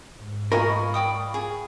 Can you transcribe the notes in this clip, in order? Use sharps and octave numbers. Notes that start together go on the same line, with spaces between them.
G#2
F4 A#4 D#5 G#5 B5 C#6
D5 G5 D#6
G#4